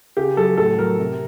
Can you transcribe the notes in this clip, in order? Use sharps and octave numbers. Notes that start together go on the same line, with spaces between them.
C#3 G4
F#3 A4
A2 A4
F#3 A#4
C3